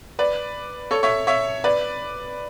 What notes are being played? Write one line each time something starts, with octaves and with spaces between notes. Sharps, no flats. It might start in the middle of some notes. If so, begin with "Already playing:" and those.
B4 D5
A4 C#5
C#5 E5
C#5 E5
B4 D5